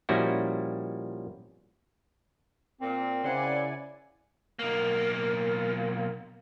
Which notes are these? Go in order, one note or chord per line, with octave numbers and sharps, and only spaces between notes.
A#2 F3 G3 C#4 E4 F#4
A#2 C4
C#3 E4 A#4 C5 D5 F#5 G#5
B1 A#3